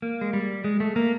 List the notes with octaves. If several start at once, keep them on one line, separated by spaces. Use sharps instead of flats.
A#3
G#3
G3
G#3
A3
A#3